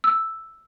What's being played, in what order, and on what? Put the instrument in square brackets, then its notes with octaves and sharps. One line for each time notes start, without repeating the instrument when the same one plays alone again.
[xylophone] E6